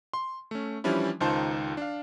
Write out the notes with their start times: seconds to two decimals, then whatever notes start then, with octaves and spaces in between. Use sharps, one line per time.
0.13 C6
0.51 A3 C#4
0.84 E3 F3 G3 C#4 D4 E4
1.21 C#2 D#3 D#4 F4 C5 A5
1.77 D4 F5